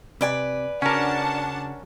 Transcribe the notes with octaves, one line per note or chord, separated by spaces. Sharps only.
C3 B4 D5 G#5
C#3 C#4 D4 F#4 A#4 F#5 A5